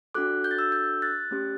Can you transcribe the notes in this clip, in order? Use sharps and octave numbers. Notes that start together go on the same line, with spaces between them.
D4 F#4 A4 D6 F#6
G6
A6
E6 G6
E6 G6
F#6 A6
A3 C#4 G4